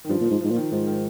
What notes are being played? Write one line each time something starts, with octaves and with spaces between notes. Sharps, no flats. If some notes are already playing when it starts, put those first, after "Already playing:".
D#3
G2 F3
A#2
F3
G#2
G#2 F3
A#2
D#3
G#2 F3
D#3